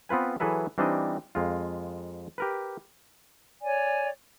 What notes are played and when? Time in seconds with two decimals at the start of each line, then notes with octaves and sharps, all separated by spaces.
0.09 B3 C4 F4 B4 G#5
0.40 E3 F#3 G#4 A4 B4 E5
0.78 E3 G3 C4 D4 D#4 D#5
1.35 F2 G#3 F4
2.38 G4 A#4 B4
3.63 C#5 D5 G#5